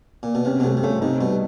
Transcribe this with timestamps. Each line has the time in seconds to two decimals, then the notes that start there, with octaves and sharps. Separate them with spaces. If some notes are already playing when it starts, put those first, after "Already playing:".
0.23 A#2
0.35 B2
0.45 C3 C#4
0.60 B2
0.64 C3 A3
0.77 C3
0.84 C#3 A3
1.01 C3 D#4
1.20 B2 G3